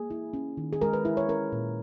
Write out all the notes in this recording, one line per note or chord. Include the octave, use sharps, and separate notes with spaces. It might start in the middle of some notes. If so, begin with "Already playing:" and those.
Already playing: A#3 G#4
E4
C#4
D#3
G#4
G#3 A#4
B4
E4
C#5
C#4 A#4
A#2